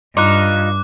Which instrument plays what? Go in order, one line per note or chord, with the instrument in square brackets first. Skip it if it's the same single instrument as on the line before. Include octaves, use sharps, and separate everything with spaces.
[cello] G2 [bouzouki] D#4 F4 [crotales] D6 F#6